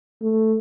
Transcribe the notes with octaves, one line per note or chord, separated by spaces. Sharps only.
A3